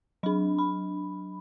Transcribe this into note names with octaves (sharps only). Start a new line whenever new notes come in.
F#3 D4 B5
B5